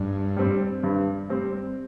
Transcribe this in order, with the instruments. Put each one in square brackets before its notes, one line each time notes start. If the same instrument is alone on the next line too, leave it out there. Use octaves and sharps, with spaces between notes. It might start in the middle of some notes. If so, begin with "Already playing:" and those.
Already playing: [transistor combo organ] G2
[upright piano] G3 C4
G2
G3 C4